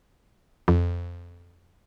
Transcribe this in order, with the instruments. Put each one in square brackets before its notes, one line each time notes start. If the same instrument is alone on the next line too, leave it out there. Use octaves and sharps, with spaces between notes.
[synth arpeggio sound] F2